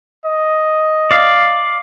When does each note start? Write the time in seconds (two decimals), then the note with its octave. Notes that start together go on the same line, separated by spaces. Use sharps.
0.25 D#5
1.11 D5 F5